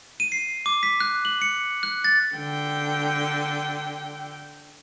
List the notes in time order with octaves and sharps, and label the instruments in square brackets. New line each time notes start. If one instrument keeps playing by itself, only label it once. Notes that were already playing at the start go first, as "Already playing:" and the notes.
[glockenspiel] D#7
C7
D6
B6
F#6
F#7
C#7
F#6
A6
[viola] D3 G5